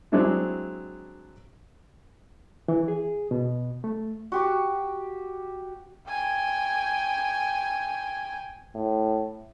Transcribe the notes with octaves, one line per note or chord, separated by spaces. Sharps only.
F#3 G#3 C4 D4 E4 F#4
E3
G#4
B2
A3
F#4 G4 D6
G5 G#5
A2